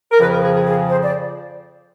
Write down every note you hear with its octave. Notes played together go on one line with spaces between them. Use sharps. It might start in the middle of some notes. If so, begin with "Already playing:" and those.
A#4
F2 C#3 F3 B4
A#4
G#4
G#4
G#4
C5
D5